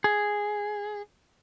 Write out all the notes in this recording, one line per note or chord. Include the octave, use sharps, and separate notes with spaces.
G#4